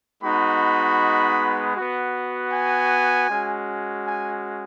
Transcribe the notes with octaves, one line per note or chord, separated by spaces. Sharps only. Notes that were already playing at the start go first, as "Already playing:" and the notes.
G#3 B3 D#4 F#4 B5
B3 F#4
G#5
G#3 C#4 F#4
G#5